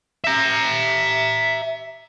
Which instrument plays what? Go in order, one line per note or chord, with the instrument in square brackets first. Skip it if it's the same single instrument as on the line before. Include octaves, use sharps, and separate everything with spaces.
[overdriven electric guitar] E5 A#5